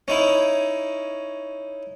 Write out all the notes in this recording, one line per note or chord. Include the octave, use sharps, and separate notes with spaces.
C#4 D#4 E4